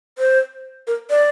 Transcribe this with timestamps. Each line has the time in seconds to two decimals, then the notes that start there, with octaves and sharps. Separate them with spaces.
0.18 C5
0.87 A#4
1.10 D5